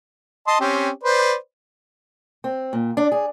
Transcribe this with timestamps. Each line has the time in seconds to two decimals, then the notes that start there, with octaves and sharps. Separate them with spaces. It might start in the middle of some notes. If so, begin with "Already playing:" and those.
0.47 D#5 A5 C6
0.60 C4 C#4 G4
1.03 B4 C5 D5
2.44 C4
2.73 A#2
2.97 D4
3.12 G#4